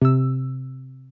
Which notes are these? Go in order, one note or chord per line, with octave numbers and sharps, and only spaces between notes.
C3 E6